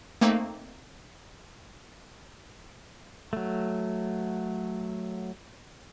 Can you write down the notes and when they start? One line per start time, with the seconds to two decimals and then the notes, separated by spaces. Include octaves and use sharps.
0.21 A3 A#3 C4 D#4
3.33 F#3 A3